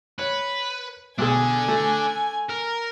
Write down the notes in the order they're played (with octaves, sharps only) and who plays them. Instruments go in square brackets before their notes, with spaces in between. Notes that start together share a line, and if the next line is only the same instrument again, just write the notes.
[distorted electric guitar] B4 [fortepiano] C#5
[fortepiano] B1 G#4 [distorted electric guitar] D4 A4 [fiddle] G#5
[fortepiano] A3
[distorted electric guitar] A#4